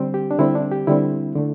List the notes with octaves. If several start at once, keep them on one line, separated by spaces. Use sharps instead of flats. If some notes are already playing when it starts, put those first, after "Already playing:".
Already playing: D3 G3 C4
G4
D4
D3 G3 C4 E4
D4
G4
D3 G3 C4 E4
D3 A3